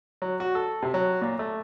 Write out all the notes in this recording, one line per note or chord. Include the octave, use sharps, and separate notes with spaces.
F#3
F#4
A4
C3
F#3
A#2
A3